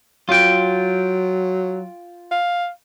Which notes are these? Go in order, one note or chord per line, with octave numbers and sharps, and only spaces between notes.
F#3 F4 G5
F5